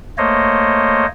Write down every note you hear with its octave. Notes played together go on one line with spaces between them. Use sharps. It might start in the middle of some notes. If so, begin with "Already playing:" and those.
A3 A#3 C5 C#5 D#5